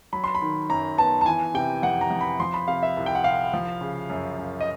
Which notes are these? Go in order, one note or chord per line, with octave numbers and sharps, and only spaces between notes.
F#3 B5
C6
B5
D#3
F#2 A#5
B3 A5
A5
E3 G#5
C3 G5
F2 F#5
A#5
F2
B5
F3 C6
B5
C3 F5
E5
C2
G5
F#5
C2 F5
F3
C#3
F#2
F#2
D#5